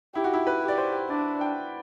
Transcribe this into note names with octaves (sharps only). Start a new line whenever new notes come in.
E4 G4
F#4
E4
B4
G4
D5
C5
D4 D5
G5